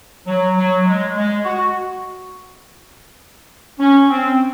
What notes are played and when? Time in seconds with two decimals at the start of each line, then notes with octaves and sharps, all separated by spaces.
0.27 F#3
0.57 F#3
0.86 G#3
1.15 G#3
1.44 F#4
3.79 C#4
4.10 C4